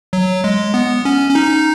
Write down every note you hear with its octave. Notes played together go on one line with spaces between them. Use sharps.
F#3
G#3
B3
C#4
C#4
D#4